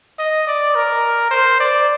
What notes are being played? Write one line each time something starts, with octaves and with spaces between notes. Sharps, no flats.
D#5
D5
A#4
C5
D5